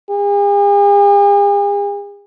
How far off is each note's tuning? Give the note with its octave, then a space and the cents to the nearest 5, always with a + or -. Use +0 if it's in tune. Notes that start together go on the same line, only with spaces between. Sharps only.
G#4 -45